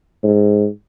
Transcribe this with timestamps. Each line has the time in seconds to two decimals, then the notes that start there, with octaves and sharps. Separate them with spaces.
0.23 G#2